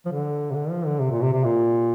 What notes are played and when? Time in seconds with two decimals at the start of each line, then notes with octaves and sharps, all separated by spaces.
0.06 F3
0.12 D3
0.51 C3
0.55 D3
0.70 F3
0.86 D3
1.00 C3
1.11 A#2
1.22 C3
1.33 C3
1.44 A#2